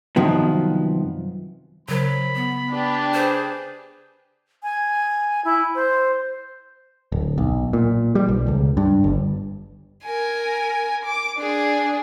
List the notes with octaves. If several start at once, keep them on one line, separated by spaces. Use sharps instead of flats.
C2 F#2 D#3 F3 B3
C#3 F#3 A#4 C5 B5
B3
D4 G4 B4
G#4 C5
G#5
E4
C5
D1
B1
A#2
G3
B1
C#2
G2
G1
A#4 G#5
D6
D4 G#4